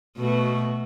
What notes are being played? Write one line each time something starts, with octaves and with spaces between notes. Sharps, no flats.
B2 A3 F#4